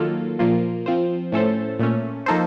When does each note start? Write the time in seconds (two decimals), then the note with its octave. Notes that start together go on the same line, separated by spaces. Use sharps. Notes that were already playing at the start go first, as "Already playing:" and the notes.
Already playing: D#3 F#3 A#3 F4 A4
0.39 A#2 F3 A#3 F4
0.86 F3 C4 F4 C5
1.32 A2 A3 C#4 A4 C5
1.79 A#2 A3 C#4
2.26 F3 A#3 D#4 A4 C5